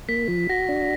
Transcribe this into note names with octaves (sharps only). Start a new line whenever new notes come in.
A#3 B6
F3
F#4 A#6
D4